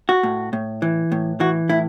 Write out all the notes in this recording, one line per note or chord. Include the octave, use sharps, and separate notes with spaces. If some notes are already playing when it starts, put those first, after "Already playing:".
F#4
A2
A2
E3
A2
E3 F#4
A2 E4